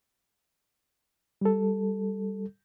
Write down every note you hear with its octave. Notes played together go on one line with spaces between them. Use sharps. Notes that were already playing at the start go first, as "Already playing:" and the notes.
G3 A4